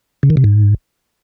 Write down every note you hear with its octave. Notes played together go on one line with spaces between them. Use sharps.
C#3
D#3
C3
G#2